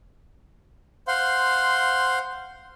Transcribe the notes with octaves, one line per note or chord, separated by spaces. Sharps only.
C5 F5 F#5 C6